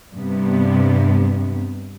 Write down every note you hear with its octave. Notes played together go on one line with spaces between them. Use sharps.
G2 C3 B3